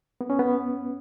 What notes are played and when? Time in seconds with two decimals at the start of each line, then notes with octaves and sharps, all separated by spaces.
0.21 B3
0.30 C#4
0.39 B3